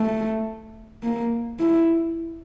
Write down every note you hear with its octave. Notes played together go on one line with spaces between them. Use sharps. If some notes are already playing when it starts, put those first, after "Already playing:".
Already playing: A3
A#3
E4